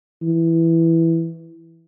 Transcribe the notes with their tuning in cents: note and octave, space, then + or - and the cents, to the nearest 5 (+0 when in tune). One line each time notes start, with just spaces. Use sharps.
E3 +0